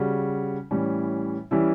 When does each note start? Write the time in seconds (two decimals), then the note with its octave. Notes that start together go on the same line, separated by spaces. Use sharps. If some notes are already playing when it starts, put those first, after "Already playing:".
Already playing: C#3 G3 C#4 F#4
0.71 A2 E3 G3 C#4
1.51 E3 G3 C#4 E4